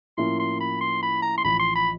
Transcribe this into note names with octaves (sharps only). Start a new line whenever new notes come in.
A2 F3 A#3 C#4 E4 C6
C6
B5
C6
B5
A#5
C6
A1 A2 F3 B5
C6
B5